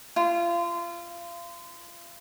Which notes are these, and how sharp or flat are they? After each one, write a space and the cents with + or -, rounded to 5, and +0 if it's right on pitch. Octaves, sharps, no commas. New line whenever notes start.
F4 -30